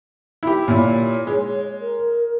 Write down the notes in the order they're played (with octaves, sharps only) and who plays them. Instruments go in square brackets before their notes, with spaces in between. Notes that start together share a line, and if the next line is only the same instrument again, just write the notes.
[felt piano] E4 G4
[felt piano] A#2 E4 [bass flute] C#5
[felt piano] G#3
[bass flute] A#4